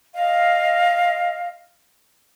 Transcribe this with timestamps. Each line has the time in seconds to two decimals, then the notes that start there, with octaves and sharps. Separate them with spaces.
0.15 D#5 F5